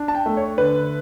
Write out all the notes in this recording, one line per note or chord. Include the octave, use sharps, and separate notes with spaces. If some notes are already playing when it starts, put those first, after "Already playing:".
Already playing: D4
A5
G5
A3
C#5
D3 B4